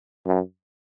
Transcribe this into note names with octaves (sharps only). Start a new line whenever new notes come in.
F#2